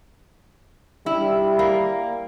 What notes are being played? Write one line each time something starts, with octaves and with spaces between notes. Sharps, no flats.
G3 E4
A#3